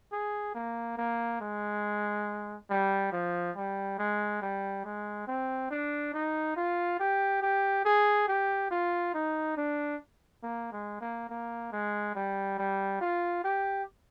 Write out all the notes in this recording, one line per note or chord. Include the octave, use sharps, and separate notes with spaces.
G#4
A#3
A#3
G#3
G3
F3
G3
G#3
G3
G#3
C4
D4
D#4
F4
G4
G4
G#4
G4
F4
D#4
D4
A#3
G#3
A#3
A#3
G#3
G3
G3
F4
G4